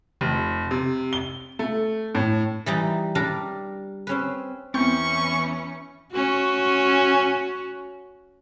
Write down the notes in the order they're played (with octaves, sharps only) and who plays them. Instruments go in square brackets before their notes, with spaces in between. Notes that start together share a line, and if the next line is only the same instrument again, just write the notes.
[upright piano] F1
C3
G7
A3
A2
[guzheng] E3 G3 D#4
G3 D4 A#4
C4 C#4 B4
[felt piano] E2 G6 [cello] E3 C#4 [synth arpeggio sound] C4 [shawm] C#6
[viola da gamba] C#4 F#4